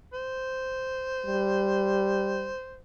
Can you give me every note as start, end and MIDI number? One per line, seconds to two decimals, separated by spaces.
0.14 2.80 72
1.26 2.52 55